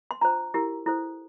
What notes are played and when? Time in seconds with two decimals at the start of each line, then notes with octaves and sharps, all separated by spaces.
0.11 C6
0.21 D4 F4 C5 A#5
0.54 E4 G4 A#4
0.86 E4 A4 C5